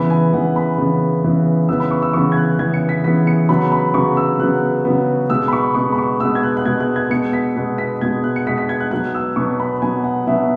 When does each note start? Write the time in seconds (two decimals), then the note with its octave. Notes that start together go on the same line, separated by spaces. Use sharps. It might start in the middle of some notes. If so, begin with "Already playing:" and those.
Already playing: C#3 E3 B3 B5
0.10 G#5
0.33 C#3 E3 B3 F#5
0.56 B5
0.78 C#3 E3 B3
1.23 C#3 E3 B3
1.69 C#3 E3 B3 E6
1.80 B5
1.91 C#6
2.02 E6
2.13 C#3 E3 B3 C#6
2.32 G#6
2.37 F#6
2.59 C#3 E3 B3 G#6
2.74 C#7
2.89 B6
3.04 C#3 E3 B3 B6
3.27 C#7
3.49 C#3 F#3 B3 B5
3.72 B5
3.94 C#3 F#3 B3 C#6
4.17 E6
4.39 C#3 F#3 B3 F#6
4.85 C#3 F#3 B3
5.30 B2 G#3 B3 E6
5.48 B5
5.53 C#6
5.75 B2 G#3 B3 C#6
5.92 B5
5.98 C#6
6.20 B2 G#3 B3 E6
6.35 G#6
6.43 F#6
6.57 F#6
6.65 B2 G#3 B3 G#6
6.80 F#6
6.96 G#6
7.10 B2 G#3 B3 C#7
7.33 B6
7.56 B2 G#3 B3
7.78 B6
8.01 B2 G#3 B3 G#6
8.24 F#6
8.36 C#7
8.46 B2 G#3 B3 B6
8.58 B6
8.69 G#6
8.80 F#6
8.91 B2 F#3 B3 F#6
9.14 E6
9.36 B2 F#3 B3 C#6
9.60 B5
9.82 B2 F#3 B3 G#5
10.04 F#5
10.27 B2 F#3 B3 E5